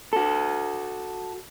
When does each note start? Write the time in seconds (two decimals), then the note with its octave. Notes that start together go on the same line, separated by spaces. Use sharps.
0.13 F#4 A4